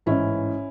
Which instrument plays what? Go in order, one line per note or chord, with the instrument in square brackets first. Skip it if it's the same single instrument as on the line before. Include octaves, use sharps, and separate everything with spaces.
[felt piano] A1 G#2 E3 C#4 E4